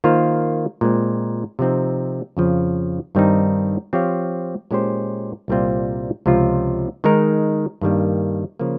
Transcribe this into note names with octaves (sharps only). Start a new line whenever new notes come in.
D#3 A#3 F4 C5 F5
A#2 G#3 C4
C3 F3 C4 D#4
F2 C#3 F3
G2 D#3 G3 C4 D#4
F3 C4 G4 C#5 F5
A#2 G#3 C#4 G4 C5
C2 A#2 G3 C4 F4
C#2 C3 F3 C4 F4
D#3 G#3 D#4 A#4
G2 D#3 G3 A#3
C#3 F3 A#3